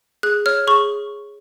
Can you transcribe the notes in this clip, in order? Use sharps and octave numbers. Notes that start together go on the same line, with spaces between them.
G#4 F#6
C#5 F6
G#4 C#6